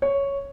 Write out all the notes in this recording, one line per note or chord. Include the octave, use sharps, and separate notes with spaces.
C#5